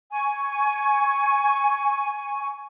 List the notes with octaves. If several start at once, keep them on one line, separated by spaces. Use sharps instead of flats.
G#5 C#6